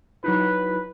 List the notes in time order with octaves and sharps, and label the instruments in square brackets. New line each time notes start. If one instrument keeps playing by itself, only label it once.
[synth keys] F#3 D#4 E4 [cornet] B4